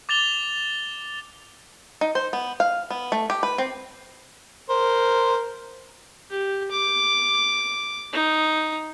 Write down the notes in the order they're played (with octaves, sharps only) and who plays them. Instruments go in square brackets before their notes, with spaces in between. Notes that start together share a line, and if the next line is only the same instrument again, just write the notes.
[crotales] D6 A6 F7 G7
[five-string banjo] D#4
C5
B3
F5
B3
A3
G4
B4
C4
[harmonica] A#4 C5
[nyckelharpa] G4
D6
D#4